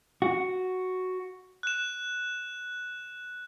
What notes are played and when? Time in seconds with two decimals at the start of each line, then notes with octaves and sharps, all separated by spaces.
0.22 F#4
1.63 F#6 E7